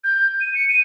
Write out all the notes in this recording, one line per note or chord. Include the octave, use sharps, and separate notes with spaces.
G6
D#7
C#7
D#7